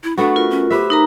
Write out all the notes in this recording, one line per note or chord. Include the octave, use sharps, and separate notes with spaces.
E4
A3 B3 D4 F#4
F4 A#4
C#4
G4 B4 C5 E5
D#4 A#4 A#5